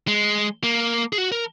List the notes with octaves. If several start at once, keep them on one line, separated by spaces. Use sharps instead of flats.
G#3
A#3
G#4
F#4
A#4